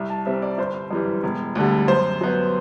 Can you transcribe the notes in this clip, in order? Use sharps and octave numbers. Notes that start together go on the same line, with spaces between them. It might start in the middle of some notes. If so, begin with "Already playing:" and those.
Already playing: C2
A5
C3 G3 C4 E5
D5
G1 C5
F#2 E3 G3
E1
D2 D3 G3
F#2 C5
F#3 B3